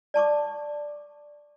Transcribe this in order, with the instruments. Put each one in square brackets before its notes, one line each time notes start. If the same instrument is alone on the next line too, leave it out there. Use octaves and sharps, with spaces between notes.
[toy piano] D5 A5 C#6 D6